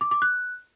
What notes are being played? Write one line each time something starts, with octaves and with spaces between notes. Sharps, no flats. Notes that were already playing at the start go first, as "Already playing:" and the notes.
D6
D6
F#6